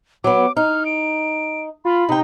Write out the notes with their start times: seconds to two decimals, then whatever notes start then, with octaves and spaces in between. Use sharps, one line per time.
0.24 F#3 B3 D6
0.57 D#4 F6
0.86 D7
1.85 F4 B5
2.09 C3 D#4 G5